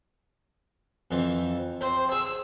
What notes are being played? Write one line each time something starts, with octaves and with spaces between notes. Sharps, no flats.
F2 E3 F3
C4 C5
G#4 E6